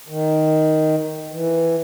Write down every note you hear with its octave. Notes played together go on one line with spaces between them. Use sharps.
D#3
E3